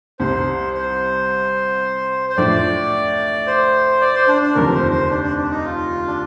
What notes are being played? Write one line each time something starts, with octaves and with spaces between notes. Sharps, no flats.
C2 C3 G3 C5
C5
C5
A2 F3 A3 D4 D5
C5
D5
C5
D4
D4
F1 D#2 D3 F3 C4 A#4
C5
C5
D4
D4
D4
D#4
F4
D4